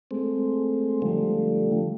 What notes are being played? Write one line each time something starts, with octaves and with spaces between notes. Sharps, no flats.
G#3 A3 C4
D3 F3 G3 A3